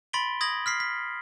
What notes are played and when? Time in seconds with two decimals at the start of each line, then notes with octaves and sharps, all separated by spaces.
0.13 B5 C6 A6 B6 D7 G7
0.41 D#6 G#6 A#6 F#7
0.66 F6 B6 C7
0.80 B6